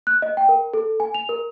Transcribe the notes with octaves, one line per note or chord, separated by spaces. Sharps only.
F#6
D#5
G5
A#4
A4
G#5
F7
A#4